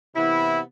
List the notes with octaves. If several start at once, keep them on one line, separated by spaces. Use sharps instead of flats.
C3 E3 B3 E4